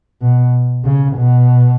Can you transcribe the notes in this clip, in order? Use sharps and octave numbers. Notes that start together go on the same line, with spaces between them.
B2
C#3
B2